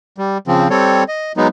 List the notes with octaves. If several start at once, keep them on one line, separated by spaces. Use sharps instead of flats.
G3
C#3 F3 C4
G3 C4 A4 C#5
D#5
F#3 G#3 B3 D#4